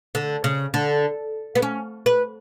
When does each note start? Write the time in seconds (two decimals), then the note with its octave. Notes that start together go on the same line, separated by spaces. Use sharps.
0.15 D3
0.44 C#3
0.74 D3
1.55 B3
1.62 C#4
2.06 B4